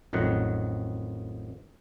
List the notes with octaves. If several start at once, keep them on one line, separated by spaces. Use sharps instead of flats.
A1 F2 D#3 F#3 F#5